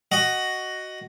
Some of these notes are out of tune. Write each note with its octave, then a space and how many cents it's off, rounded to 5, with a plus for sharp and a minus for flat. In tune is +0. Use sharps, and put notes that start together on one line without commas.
F#4 +10 D#5 +0